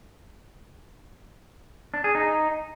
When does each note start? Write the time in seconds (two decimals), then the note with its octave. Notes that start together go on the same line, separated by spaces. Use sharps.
1.94 D4
2.04 G#4
2.15 D#4